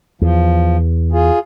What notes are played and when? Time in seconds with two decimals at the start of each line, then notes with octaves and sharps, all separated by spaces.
0.22 E2 F3
1.12 F4 G#4